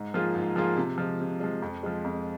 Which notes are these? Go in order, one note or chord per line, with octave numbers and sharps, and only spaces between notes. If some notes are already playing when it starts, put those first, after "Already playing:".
Already playing: G#2
F3 A#3 F4 G#4
G#2
F3 A#3 F4 G#4
C3
F3 G#3
C3
F3 G#3
F2
F3 G#3
F2